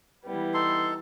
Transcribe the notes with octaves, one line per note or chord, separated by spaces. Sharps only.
E3 G3 B3
D#4 A4 C6